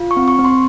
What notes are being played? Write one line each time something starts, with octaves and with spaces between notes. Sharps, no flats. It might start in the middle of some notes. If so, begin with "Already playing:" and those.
Already playing: F4
C#6
C4
C#6
C4
C6